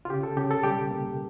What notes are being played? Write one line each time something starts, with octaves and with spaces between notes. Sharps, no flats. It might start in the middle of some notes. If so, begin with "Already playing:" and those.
F4
C#3 G4
A4
C#3 G4
A4
G3 G4
A#3